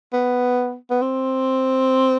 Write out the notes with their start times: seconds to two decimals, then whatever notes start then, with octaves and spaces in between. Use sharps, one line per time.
0.13 B3
0.90 B3
1.02 C4